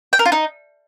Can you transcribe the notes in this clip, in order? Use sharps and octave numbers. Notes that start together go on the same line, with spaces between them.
G5
A#4
F4
D#4